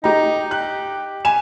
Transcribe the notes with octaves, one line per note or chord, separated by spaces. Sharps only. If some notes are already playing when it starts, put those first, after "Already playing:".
D#4 G4 A#5
G4 F#6
G#5 E7